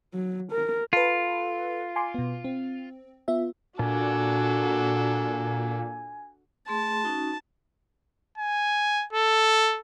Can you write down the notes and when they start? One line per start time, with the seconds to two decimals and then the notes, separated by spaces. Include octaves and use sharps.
0.14 F#3
0.51 A#4
0.93 F4 A4 B4
1.96 G#5 C6 D6
2.14 B2 B3
2.44 C4
3.28 B3 F4 E5
3.79 A#2 D4 F#4 A4 G#5
6.68 A3 G#4 A5 C6
7.03 C#4 D#4 F#4
8.38 G#5
9.13 A4